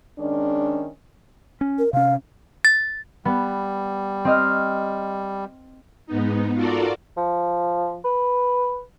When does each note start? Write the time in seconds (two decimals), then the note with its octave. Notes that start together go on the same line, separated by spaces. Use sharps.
0.19 D#3 G#3 C#4 D4
1.61 C#4
1.79 A#4
1.93 C3 C#4 F5
2.65 A6
3.25 G3 B3
4.25 C4 D#5 F6
6.06 G#2 B3 D#4
6.54 F4 F#4 A4 A#4 D5
7.17 F3
8.05 B4